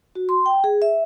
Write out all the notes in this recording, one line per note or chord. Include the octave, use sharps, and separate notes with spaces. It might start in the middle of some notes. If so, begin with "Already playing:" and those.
F#4
C6
G5
G#4
E5